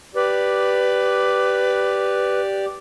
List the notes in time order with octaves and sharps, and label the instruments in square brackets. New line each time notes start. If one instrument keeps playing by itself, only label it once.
[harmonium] G4 D5 [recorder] B4